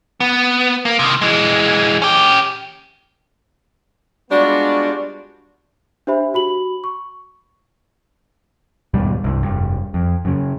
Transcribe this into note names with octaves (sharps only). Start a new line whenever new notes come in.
B3
A#3
C3 D#3
E3 G#3
C#4 G4
G3 G#3 B3 D4 F4 F#4
D4 G4 C5 E5 B5
F#4 B5 F#7
C#6
D#2 G#2 B2 G3
C2 G2
F1 G2
F2
F#2 C#3